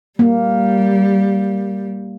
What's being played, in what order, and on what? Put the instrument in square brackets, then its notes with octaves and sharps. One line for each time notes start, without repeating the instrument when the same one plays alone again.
[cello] G3 [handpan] A#3